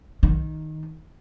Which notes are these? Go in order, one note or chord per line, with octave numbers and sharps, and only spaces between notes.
D#3